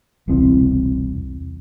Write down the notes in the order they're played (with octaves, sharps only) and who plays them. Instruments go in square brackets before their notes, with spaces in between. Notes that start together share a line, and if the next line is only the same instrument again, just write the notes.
[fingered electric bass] E1 C2 E3 C4